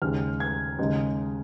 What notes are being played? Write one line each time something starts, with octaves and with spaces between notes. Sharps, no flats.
D#2 C#3 G#3 F6
G#6
D#2 C#3 G#3 D#4